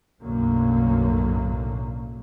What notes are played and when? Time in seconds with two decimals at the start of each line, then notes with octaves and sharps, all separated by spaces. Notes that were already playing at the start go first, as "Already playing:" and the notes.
0.22 B1 F#2 A2 D3 F#3 A#3